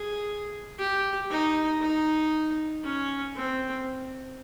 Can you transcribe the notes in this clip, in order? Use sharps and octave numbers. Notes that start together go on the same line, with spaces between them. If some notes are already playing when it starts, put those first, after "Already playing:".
Already playing: G#4
G4
D#4
D#4
C#4
C4